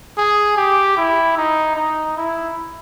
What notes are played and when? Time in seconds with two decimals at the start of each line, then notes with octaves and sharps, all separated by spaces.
0.17 G#4
0.57 G4
0.97 E4
1.37 D#4
1.76 D#4
2.17 E4